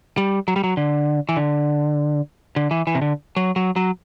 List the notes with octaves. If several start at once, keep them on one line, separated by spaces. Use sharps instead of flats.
G3
F#3
G3
F#3
D3
E3
D3
D3
E3
E3
C3
D3
F#3
F#3
F#3